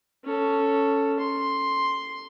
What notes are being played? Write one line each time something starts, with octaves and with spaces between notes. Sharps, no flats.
C#4 A4
C6